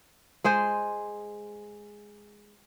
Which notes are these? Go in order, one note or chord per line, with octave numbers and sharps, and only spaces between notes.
G#3 G#4 C5